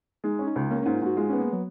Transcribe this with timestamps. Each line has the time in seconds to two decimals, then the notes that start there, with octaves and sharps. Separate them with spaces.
0.24 G#3 D#4
0.39 C#4
0.47 D#4
0.56 C#2
0.70 A#3 C#4
0.82 G#2 C#4
0.94 F4
1.01 G#2 F#4
1.16 G#3 F4
1.29 B3 C#4
1.40 A#3
1.52 F#3